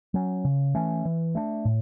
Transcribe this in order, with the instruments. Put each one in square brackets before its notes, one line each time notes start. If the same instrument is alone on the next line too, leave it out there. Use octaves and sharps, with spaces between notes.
[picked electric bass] F#3 C#4
C#3
E3 A3 C#4
E3
A3 D4
A2